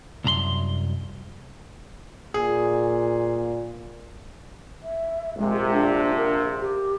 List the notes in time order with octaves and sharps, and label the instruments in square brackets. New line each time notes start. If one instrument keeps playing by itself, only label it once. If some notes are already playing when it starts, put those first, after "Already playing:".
[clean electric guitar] C2 F#2 A#5 C6
[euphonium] A#2 [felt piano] G#4
[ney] E5
[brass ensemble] A#1 C3 [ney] G#3
[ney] D4
A#4
G4